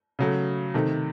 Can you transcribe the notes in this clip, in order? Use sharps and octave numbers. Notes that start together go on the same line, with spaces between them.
C#3 F#3 A3
C3 D#3 A3